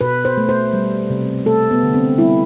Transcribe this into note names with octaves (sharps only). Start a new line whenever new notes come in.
B2 B4
C5
A3
C5
G3
C3
A3 A4
B3
D3
C4
G3 E4